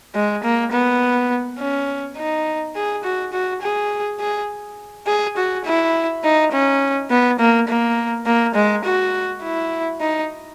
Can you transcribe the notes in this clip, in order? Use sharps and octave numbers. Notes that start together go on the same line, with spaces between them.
G#3
A#3
B3
C#4
D#4
G#4
F#4
F#4
G#4
G#4
G#4
F#4
E4
D#4
C#4
B3
A#3
A#3
A#3
G#3
F#4
E4
D#4